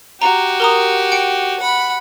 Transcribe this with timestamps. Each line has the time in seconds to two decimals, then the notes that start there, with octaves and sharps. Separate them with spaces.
0.22 F#4 G4 A#5
0.60 A#4 A#5 D#6
1.12 G5 C#7
1.60 F#5 B5